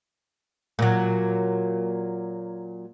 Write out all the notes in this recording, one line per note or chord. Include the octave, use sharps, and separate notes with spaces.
A#2 F#3